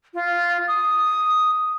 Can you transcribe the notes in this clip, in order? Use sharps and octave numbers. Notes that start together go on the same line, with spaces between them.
F4
D#6